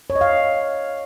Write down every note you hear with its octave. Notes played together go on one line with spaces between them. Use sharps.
C#5
D#5
F5